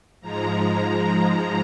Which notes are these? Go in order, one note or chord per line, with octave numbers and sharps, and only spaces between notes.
G#2 F3 G#3 A#5